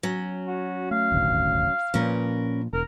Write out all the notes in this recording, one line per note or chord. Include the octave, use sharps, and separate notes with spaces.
F#3 C#4
F#4
A3 F5
D#1 G#1 D2
A#2 F3 C#4 A#4 B4
E1 A#4